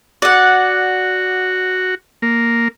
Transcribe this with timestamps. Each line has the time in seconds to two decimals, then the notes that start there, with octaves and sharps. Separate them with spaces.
0.22 F#4 D5 F#5
2.22 A#3